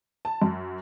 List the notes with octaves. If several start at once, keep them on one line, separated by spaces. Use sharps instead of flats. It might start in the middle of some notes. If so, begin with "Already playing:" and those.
A5
F#2